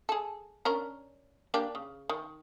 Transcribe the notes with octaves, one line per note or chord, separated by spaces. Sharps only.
G#4 A4
C#4 D4 A#4
A#3 D4 G4
C#3
D#3